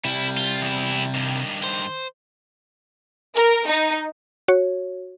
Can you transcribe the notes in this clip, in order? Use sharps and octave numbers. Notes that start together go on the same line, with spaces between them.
C3 G3 E4
F4
E2 E4
G2 D#3
C5
A#4
D#4
F#4 C#5